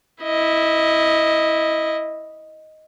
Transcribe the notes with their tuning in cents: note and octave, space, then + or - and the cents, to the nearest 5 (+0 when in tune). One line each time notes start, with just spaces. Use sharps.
E4 -10 D#5 +0